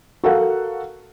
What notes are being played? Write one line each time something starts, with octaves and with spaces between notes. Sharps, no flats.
F#4 A4 A#4 F5 F#5